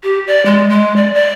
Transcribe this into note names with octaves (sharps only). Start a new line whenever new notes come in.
G4
D5
G#3
G#3
D5
D5